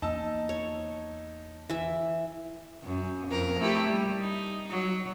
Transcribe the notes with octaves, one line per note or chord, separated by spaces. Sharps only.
E2 A#3 D#4 A5 E6
C#5
E3 E5
F#2
F2 A#4
A3 E4 G4
G3
D#4
F#3